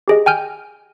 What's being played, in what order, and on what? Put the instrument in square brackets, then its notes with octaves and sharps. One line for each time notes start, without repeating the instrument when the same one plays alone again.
[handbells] G4 G#4 D#5
G5 G#5 F6 G6